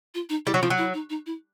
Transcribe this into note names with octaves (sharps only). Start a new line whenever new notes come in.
F4
D#4
G3 E4
F#3
F3 F4
F#3
E4
D#4
D#4
E4